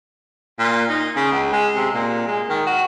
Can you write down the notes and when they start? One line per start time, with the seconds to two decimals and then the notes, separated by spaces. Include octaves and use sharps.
0.59 A#2
0.89 D#4
1.16 C#3
1.32 C#2
1.52 G#3
1.76 C3
1.94 A#2
2.27 G#3
2.50 D#3
2.66 F#4